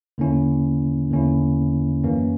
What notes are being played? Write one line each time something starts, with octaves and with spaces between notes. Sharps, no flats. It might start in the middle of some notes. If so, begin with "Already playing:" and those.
E2 D3 A#3 C#4 E4
E2 D3 A#3 C#4 E4
F#2 E3 A#3 C#4